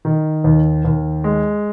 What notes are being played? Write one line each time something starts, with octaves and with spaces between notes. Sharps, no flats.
D#3
D#2
D#2
G#3